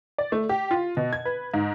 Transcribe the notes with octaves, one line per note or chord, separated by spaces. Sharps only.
D5
A3
G4
F4
B2
G#6
B4
G#2